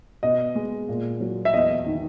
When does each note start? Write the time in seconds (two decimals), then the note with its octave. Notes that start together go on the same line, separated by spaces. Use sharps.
0.23 B2 D#5
0.55 G#3
0.89 A#2
1.20 F#3
1.45 E5
1.53 E2 D#5
1.86 D#3